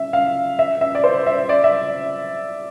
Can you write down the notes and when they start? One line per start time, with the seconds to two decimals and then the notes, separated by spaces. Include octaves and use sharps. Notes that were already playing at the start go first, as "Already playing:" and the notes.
Already playing: E5
0.13 F5
0.59 E5
0.81 E5
0.95 D5
1.04 C5
1.26 E5
1.49 D5
1.64 E5